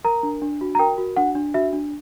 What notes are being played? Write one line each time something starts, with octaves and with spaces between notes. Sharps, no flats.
A#4 A#5
D4
D4
F#4
A#5
A#4 G5
F#4
D4 F#5
D4
F#4 E5
D4